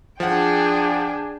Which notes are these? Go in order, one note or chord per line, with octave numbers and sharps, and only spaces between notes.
F3 D4 G#4 F#5 G5